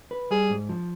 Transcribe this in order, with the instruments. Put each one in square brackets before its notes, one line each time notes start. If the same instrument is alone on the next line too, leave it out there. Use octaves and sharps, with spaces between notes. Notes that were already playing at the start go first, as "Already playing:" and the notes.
[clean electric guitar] B4
[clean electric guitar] G3 [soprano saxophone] G#4
[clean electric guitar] G#2
F3